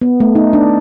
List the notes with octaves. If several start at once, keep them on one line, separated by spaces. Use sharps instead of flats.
B3
A3
D#4
D4